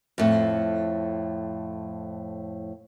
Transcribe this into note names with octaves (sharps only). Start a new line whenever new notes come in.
F2 A2